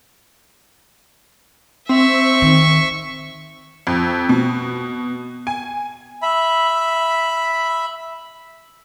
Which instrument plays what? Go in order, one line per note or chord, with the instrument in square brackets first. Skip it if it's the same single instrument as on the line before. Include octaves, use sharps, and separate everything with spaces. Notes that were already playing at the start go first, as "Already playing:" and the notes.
[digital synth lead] C4 [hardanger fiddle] E5 C#6
[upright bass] D#3
[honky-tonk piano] F2
B2
G#5
[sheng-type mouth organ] E5 B5